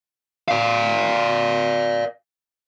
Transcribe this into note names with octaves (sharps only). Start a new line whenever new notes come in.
D5 F5